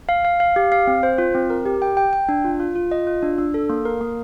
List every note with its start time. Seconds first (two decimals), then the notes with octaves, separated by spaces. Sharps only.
0.09 F5
0.25 F5
0.40 F5
0.56 G4
0.72 F5
0.87 C4
1.03 C5
1.18 F4
1.35 C4
1.50 A#4
1.66 G4
1.82 G5
1.97 G5
2.13 G5
2.29 D4
2.44 F4
2.60 F4
2.76 F4
2.91 D#5
3.07 F4
3.23 D4
3.38 D4
3.54 A4
3.70 A#3
3.85 A#4
4.01 A#3